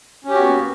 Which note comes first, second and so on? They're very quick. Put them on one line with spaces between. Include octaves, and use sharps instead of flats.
C#4 G4 F#4 B3 A#3